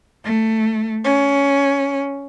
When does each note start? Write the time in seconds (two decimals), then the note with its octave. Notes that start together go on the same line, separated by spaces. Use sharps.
0.24 A3
1.04 C#4